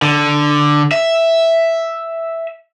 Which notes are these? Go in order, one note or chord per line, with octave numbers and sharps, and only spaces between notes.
D3
E5